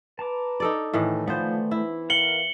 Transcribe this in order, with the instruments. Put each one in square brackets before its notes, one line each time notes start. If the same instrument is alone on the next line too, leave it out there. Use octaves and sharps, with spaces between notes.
[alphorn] B4 [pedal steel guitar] A5 A#5 D6
[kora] D#4 A4 D5
[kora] A2 D#3 E3 [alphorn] A3
[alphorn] F3 [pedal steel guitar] A3 D5 G6 [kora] B3 C5
[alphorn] E3 [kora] E4
[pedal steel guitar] A#4 F5 F#5 [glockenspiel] C#7 F#7 G7